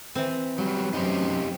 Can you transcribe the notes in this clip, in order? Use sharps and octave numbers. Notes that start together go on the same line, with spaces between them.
E3 C4
F#3 G3
F#2 A3 C#4 D#4 G4 C5